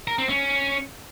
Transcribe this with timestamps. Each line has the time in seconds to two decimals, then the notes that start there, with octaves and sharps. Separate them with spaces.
0.08 A#4
0.18 C4
0.29 C#4